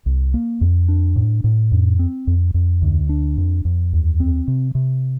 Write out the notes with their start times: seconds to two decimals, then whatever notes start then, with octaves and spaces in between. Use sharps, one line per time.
0.06 C2
0.34 A#3
0.61 F2
0.88 D4
1.16 A2
1.44 A2
1.72 F2
1.99 C4
2.27 F2
2.54 F2
2.82 D2
3.09 D4
3.37 F2
3.65 F2
3.93 D#2
4.20 C4
4.48 C3
4.75 C3